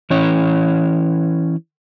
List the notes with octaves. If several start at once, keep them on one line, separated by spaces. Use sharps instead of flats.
E3 C#4 E4 C#5